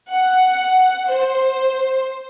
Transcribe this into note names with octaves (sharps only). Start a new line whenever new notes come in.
F#5
C5